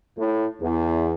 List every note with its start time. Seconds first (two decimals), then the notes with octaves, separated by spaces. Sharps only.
0.18 A2
0.62 E2